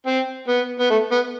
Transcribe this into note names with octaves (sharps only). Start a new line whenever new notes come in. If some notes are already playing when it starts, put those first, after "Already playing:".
C4
B3
B3
A3
B3